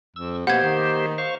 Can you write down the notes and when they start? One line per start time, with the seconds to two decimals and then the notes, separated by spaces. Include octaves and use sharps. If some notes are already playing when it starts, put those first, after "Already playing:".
0.16 F2 E6
0.47 B2 A#3 G4 C5 F#5 G#6
0.63 D#3
1.18 C5 F5 C#6